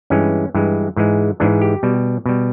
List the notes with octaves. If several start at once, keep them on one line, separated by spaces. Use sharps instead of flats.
G2 E3 G#3 C#4
G2 E3 G#3
G#2 E3 G#3
G#2 E3 G#3 D4
G4
B2 G3
B2 G3